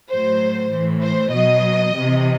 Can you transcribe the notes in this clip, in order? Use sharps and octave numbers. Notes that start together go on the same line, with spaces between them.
A2 F#3 C5
A2 E3
C5
B2 F#3 D#5
C3 E3